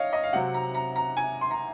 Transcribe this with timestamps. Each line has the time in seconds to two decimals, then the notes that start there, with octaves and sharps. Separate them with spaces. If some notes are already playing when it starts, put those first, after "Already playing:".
Already playing: C#5 D#5 F5
0.13 D#5
0.23 F5
0.33 C3 F#3 C4 F#5
0.54 A#5
0.75 A#5
0.96 A#5
1.17 G#5
1.41 C6
1.51 A#5